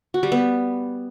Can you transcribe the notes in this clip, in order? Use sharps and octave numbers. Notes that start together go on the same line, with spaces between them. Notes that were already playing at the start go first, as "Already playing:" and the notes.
F#4
G3
B3